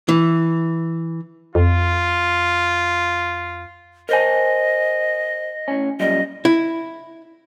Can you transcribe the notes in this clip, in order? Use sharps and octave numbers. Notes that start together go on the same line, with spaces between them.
E3
F2 F4
A#4 C5 D#5 G#5
A2 C#4
F#2 A#2 G3 D#5
E4